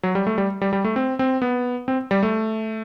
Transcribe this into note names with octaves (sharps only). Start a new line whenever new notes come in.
F#3
G3
A3
G3
G3
G3
A3
C4
C4
B3
C4
G3
A3